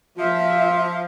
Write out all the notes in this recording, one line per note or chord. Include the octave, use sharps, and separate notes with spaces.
F3 F4 E5